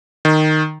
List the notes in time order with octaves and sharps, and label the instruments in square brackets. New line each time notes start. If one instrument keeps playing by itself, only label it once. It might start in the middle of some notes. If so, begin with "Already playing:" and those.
[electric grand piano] D#3